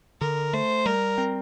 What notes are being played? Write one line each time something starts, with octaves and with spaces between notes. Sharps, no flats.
D3 A#4
A3 C5
G3 A#4
C4